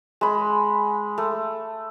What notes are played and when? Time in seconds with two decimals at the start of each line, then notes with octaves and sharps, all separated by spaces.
0.21 G#3 B5
1.18 A3